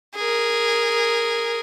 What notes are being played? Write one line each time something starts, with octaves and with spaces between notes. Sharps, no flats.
G#4 A#4